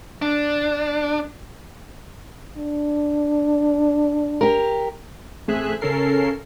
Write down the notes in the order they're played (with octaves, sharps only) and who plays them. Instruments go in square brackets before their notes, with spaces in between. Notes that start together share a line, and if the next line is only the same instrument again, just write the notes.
[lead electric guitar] D4
[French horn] D4
[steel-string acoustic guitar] G4 A#4
[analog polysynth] A1 A3 C4 G#4 E5 F#6
C#3 C#4 A4 A#4 C7